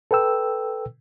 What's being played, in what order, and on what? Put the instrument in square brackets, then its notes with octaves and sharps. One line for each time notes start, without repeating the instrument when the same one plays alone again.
[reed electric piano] A4 B4 G5 E6